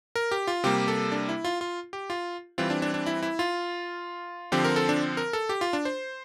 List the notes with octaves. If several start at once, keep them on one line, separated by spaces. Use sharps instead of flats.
A#4
G4
F4
C3 G3 A#3 G4
A4
D4
E4
F4
F4
G4
F4
E3 G3 C4 F4
D4
D4
D4
E4
E4
F4
D3 F3 C4 G4
A#4
A4
D4
A#4
A4
G4
F4
D4
C5